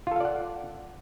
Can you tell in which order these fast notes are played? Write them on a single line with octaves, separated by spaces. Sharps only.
F4 A4 F5 D5 F#5